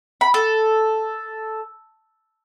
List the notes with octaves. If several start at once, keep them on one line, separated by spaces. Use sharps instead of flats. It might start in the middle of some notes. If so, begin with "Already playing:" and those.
B5
A4